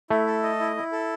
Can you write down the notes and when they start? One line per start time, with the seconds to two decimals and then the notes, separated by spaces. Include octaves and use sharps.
0.10 A3 E4
0.26 A4
0.43 D#5
0.60 E4
0.76 E4
0.92 A4